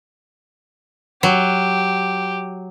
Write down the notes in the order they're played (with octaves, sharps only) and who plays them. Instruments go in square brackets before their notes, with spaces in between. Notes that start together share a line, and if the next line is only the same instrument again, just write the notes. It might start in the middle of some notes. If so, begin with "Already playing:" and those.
[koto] F#3 [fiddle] G4